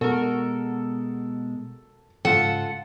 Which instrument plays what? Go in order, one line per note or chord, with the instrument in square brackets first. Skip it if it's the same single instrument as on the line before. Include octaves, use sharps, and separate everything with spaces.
[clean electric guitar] B2 G#3 [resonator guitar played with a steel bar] F#4 A#4 [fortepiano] A4
[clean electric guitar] G#2 C#3 [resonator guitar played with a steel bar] F4 A4 [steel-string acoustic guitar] F#5